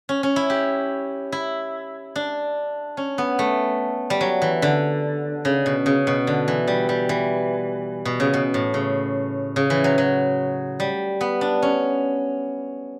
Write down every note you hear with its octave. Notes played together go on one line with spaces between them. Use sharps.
C#4
C#4
E4
G4
E4
D4
C#4
B3
A3
G3
F#3
E3
D3
C#3
B2
C#3
B2
D3
E3
G3
G3
E3
B2
C#3
B2
A2
C#3
C#3
E3
F#3
F#3
G3
B3
D4
C#4